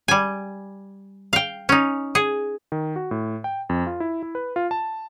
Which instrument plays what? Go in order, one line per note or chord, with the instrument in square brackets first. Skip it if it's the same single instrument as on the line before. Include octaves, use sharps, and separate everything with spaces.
[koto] G3 G#5
F5 G5
C#4 D#4
G#4
[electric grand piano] D#3
F#4
A2
G5
F2
F4
E4
E4
B4
F4
A5